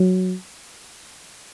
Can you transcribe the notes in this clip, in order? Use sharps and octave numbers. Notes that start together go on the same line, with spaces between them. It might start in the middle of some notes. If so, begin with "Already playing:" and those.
Already playing: F#3